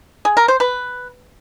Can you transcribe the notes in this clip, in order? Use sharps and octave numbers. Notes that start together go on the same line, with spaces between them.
G#4
A#4
C5
B4